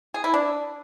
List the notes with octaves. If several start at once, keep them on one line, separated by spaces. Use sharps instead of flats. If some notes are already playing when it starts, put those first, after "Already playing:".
G#4
E4
D4